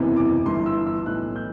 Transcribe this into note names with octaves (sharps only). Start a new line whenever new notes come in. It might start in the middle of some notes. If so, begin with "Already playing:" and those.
Already playing: F#1 E2 C3 E3
D6
G1 G2 E3 C6
E6
E6
B1 A2 E3 F#6
G6